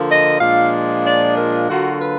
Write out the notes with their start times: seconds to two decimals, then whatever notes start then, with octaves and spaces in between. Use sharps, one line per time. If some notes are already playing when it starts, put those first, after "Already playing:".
Already playing: D3 F3 A#3
0.08 D#5
0.40 A#2 F3 G#3 D4 F4 F5
1.05 D5
1.37 A#4
1.69 D3 F#3 A#3 F4 F#4
2.02 B4